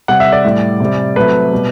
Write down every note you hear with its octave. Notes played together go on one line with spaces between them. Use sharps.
C3 G3 F#5
E5
D5
A2 G3
C3 G3
C3 F#3 A3 B4
B2 G3